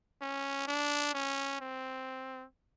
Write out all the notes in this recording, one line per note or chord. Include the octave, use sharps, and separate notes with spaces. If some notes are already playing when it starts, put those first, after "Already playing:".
C#4
D4
C#4
C4